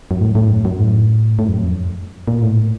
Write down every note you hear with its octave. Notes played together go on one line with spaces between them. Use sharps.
F#2
A2
A2
F#2
F#2
A2
A2
F#2
F2
A#2
A2